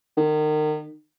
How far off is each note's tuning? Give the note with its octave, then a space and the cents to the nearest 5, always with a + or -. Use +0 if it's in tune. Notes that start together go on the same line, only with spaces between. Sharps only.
D#3 -30